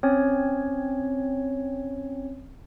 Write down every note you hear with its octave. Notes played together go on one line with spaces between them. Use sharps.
C4 C#4 C#5